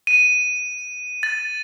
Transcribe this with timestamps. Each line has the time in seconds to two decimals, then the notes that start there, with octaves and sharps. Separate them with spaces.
0.07 D#7
1.23 A6